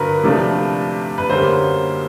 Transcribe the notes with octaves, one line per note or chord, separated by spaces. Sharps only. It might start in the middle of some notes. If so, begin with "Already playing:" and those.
Already playing: G2 D3 F#3 A#4 B4
C3 F3 A3 D4
B4
F#2 D3 G3 A#3 C#4 C5